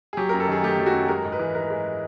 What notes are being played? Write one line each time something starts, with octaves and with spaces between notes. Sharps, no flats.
G#4
F#3 G4
F#2 A#4
A4
D#3 G#4
A3 G4
F#3
F#4
F#2
G#3 A#4
G#2
B4
E3
G#2 A#4
G#3